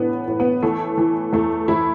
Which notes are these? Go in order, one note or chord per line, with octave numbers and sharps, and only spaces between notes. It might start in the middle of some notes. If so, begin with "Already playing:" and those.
Already playing: A2 E3 B3 D4
A2
B3
E3 A3
E3
E2 A3
E2 E4